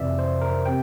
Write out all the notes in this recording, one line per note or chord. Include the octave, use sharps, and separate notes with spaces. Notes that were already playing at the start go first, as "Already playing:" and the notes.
Already playing: F2 C3 E3 D5 E5
C5
A#4
C3 G5